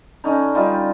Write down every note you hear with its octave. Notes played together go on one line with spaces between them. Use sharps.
D3 C#4 D#4
G3 D#4 F4